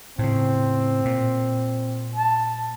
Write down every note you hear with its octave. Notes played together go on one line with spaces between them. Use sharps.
A2 C#3 C4
A#2
A5